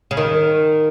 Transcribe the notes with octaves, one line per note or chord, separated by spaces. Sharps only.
C#3
D#3